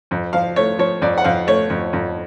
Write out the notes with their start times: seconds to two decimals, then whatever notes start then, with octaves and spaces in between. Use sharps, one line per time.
0.11 F2
0.33 F3 F5
0.56 A3 C#5
0.79 F3 C#5
1.02 F2 D5
1.18 F#5
1.24 F2 F5
1.47 A3 C#5
1.70 F2
1.93 F2